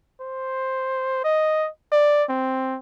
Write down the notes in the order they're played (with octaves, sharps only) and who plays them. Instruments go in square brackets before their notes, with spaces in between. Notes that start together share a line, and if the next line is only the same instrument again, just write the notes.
[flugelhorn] C5
D#5
D5
C4